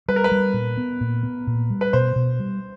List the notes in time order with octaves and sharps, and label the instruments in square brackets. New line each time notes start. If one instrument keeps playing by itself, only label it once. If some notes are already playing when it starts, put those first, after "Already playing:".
[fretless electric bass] G3 [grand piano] B4
[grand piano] A#4
B4
[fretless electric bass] G3
A#2
B3
A#2
B3
A#2
G3
[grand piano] B4
[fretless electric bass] B2 [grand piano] C5
[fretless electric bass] B2
G3